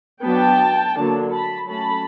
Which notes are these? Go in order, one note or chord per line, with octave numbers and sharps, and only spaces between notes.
F#3 B3 D4 G5 A5
D3 F#3 A#3 D4
A5 B5
F#3 A3 C#4 A5 B5